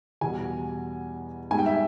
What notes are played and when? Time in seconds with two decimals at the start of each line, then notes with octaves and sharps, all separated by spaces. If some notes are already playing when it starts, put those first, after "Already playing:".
0.21 E2 B2 G3 G#5
1.51 G#2 G#5
1.55 G3 G5
1.66 E5